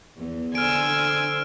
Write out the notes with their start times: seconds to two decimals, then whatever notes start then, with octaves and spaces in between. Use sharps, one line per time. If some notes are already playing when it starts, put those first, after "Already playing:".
0.16 E2
0.55 D3 C5 G#5 E6 F6 D7